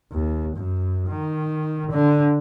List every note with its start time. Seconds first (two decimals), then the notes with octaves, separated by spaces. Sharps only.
0.12 D#2
0.56 F#2
1.09 D#3
1.91 D3